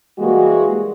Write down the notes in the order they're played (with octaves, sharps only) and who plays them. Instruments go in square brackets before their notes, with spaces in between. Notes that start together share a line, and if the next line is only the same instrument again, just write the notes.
[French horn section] E3 G3 G#3 A#3 F#4